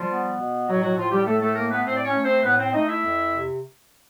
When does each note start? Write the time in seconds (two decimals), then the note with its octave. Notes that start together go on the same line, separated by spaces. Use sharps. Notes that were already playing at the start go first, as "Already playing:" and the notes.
Already playing: F3 G3 F4
0.09 B3
0.39 B2
0.67 A2 F#3 F#4
0.82 F#3 F#4
0.97 A2 F3 F4
1.11 G3 G4
1.26 A2 A3 A4
1.41 A3 A4
1.55 A3 A#3 A#4
1.71 B3 B4
1.85 A2 C4 C5
1.96 D5
2.04 C#4 C#5
2.14 A3
2.23 C4 C5
2.43 A2 B3 B4
2.58 C4 C5
2.73 A3 D#4 D#5
2.87 E4 E5
3.02 F2
3.31 C3